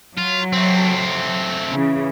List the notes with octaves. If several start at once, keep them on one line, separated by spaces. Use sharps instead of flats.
F#3 F4
A3 C4
C#3 E3